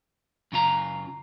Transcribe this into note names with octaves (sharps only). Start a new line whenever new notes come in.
F#2 C#3 F4 A#5